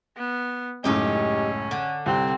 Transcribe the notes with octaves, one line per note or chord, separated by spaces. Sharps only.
B3
C#2 F#2 A2 C#4 D#4 G4 D#5
D3
C2 C4